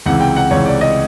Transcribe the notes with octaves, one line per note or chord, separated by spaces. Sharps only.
C#2 C3 E3 F#5
G5
F#5
C#2 C3 E3 C#5
D5
D#5